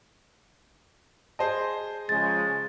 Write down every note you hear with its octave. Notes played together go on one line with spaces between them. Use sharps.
G#4 C5 D#5 A5
C#3 F3 G#3 A6